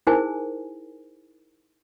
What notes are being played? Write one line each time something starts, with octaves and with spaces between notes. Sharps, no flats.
D#4 E4 G#4 A#4 C5 G#5